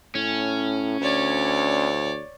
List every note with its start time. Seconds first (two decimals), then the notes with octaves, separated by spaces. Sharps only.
0.15 A2 C#4
1.01 D2 C#5 D5